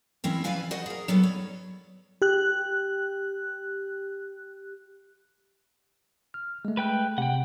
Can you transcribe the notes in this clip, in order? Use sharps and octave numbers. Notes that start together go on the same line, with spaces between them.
E3 C4 C#4 E4
C#3 F3 E4 B4 F5 G#5
F#4 C5 D#5 F#5
G#4 A#4
F#3 G3 B3 D#4 A4 B4
C#5
G4 F#6
F6
G#3 A3
B4 G5 F#6
C3 F#5 G5